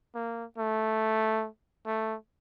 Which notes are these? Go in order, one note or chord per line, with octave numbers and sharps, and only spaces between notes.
A#3
A3
A3